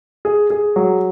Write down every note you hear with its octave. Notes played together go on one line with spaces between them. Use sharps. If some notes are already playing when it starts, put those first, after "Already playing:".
G#4
G#4
F#3